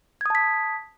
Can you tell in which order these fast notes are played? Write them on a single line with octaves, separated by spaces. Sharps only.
G#6 D#6 A5 B6